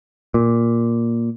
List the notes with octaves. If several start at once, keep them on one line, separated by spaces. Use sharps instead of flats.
A#2